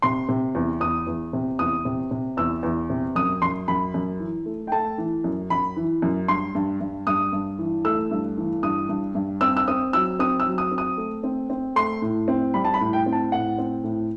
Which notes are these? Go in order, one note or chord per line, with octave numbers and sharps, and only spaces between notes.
C3 C6
C3
E2
E2 D#6
E2
C3
E2 D#6
C3
C3
E2 E6
E2
C3
F#2 D#6
F#2 C6
F#2 B5
F#2
E3
A3
G5
A3 A5
E3
F#2
F#2 B5
E3
F#2
G2 C6
G2
G2
G2 D#6
G2
E3
A3 E6
G2
E3
G2 D#6
G2
G2
C4 E6
E6
C4 D#6
F#3 E6
C4 D#6
E6
F#3
D#6
C4
D#6
A3
C4
C4
A3 C6
A2
C4
G3 B5
A5
B5
A2
G5
C4
A5
A2 F#5
C4
A2